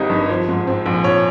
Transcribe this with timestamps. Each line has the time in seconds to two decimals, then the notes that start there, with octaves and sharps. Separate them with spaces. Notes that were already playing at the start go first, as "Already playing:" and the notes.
Already playing: G#1 G3 C4 D#4
0.10 G2
0.29 F3
0.49 G#2
0.67 C4
0.86 A#1
1.04 F3 C#5